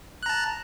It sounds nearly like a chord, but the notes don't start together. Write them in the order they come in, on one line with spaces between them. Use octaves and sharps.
F#6 A#5 A5